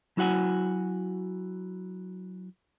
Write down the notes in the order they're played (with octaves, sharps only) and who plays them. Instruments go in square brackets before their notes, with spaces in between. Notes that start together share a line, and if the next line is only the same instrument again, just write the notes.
[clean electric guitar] F#3 E4 F#4 F#5 G#5